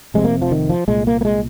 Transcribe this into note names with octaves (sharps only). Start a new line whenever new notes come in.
F1 F2 C3 G#3
A#3
F3
D#3
F3
C2 A#2 G#3
A#3
A#3
G#3